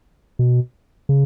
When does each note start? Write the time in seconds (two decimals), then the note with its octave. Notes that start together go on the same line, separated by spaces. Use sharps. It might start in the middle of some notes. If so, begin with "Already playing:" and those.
0.39 B2
1.09 C#3